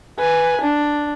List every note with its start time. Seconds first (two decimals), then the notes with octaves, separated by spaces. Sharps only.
0.19 B4 G#5
0.62 D4